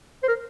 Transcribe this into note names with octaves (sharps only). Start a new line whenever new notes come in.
C5
A#4